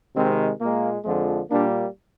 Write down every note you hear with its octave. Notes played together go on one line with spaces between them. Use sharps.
C3 D#3 G#3 C4
A#2 G#3 A#3
F2 D3 F3 G#3
A#2 G3 A#3 D4